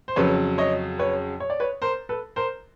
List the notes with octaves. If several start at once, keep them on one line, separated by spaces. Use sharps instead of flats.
C5
F2 C#3 F#3 B4 C#5
C#5 D#5
B4 C#5
C#5
D5
B4 C#5
A#4 C5
A4 B4
A#4 C5